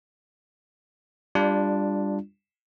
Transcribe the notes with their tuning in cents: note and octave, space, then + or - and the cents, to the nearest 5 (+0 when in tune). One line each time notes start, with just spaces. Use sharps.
G3 +20 D4 +0 F4 -10